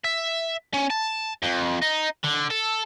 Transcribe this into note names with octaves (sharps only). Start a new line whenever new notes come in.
E5
C#4
A5
F2
D#4
D3
A4